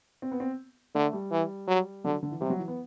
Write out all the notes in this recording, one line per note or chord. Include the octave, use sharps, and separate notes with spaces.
C4
B3
C4
D3 A3
G3
E3
F#3
D3 F#3
D3
E3
C3 G3
F#3
E3
B3